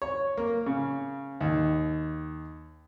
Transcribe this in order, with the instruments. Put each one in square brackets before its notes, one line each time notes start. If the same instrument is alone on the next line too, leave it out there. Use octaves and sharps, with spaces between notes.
[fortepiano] C#5
A#3
C#3
D#2